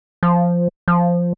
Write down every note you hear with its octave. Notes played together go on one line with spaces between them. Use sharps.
F3
F3